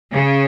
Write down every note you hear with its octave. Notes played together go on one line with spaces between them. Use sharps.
C#3